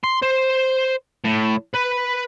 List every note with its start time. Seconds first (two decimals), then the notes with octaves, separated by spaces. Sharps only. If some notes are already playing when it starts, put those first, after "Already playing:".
0.04 C6
0.22 C5
1.25 A2
1.75 B4